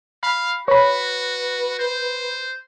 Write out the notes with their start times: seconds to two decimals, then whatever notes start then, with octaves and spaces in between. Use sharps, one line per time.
0.23 F5 B5
0.68 F#4 B4 C#5 B5
1.79 C5